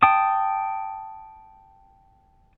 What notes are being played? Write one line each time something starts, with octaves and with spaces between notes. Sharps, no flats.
G5 A5 D#6